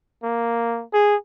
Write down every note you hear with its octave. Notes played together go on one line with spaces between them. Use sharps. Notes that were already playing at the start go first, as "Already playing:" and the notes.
A#3
G#4